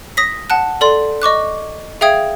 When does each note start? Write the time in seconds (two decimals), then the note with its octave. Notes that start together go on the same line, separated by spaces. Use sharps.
0.17 D#6 A#6 B6
0.50 F#5 A5 F#6
0.81 A4 D5 C6
1.22 D#5 C#6 D6 F#6
2.01 G#4 E5 F5 G5 D#6 G#6